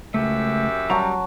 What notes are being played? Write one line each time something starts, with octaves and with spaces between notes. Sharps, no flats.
C#2 F#2 A3 G4 E5
F#3 G3 F#4 A5 A#5